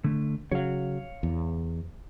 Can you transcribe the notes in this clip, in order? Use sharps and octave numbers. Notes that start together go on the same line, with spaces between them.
D3 A3
C#3 F#3 C#5 F5
E2